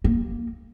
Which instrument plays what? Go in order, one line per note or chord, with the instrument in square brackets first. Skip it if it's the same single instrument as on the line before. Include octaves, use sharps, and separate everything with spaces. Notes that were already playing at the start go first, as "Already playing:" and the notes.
[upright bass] A#3